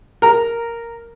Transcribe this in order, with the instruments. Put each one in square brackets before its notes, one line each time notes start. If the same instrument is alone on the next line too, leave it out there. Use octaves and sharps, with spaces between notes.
[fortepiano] A#4 A#5